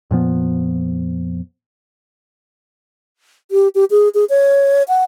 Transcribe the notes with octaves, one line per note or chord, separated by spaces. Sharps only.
F2 A#2 F3 B3
G4
G4
G#4
G#4
C#5
F#5